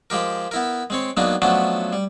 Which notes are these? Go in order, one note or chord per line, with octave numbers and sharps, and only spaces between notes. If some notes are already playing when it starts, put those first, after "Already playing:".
F3 G#3 G4 A#4
B3 E4 A#4
G#3 C4 C#5
F#3 G#3 A#3 B3 D4 D#4
F3 F#3 A3 B3 C#4 D4
G3